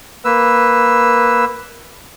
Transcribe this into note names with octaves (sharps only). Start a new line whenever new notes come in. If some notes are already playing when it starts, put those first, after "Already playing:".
A#3 B4 E6